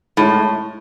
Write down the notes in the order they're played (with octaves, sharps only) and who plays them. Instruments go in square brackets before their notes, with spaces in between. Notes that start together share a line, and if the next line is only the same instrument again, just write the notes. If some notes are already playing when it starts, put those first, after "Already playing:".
[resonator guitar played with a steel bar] A2 [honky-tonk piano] G#3 C#4 E4